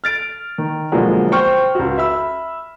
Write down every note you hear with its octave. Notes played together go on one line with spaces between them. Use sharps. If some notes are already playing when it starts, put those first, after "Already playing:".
F6 A6 D7
D#3
B2 D3 F3 F#3 G#3 A#3
C5 G5 C#6 F6
C#2 F#4
E5 B5 E6